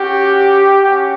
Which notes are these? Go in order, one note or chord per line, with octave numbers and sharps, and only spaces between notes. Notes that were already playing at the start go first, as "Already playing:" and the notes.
Already playing: C#4 F#4 G4
C#4 F#4